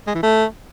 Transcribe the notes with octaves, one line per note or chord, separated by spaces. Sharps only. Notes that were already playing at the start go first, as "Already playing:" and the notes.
G#3
E3
A3